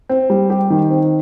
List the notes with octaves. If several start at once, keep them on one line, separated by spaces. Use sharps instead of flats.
C4
G3
G4
D#3
C4